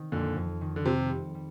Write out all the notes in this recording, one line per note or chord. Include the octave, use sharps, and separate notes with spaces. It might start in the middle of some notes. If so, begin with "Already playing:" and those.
Already playing: D#3 C4
F2 A#2 D3
F2
D#3
D3
C3 C4
G3
G3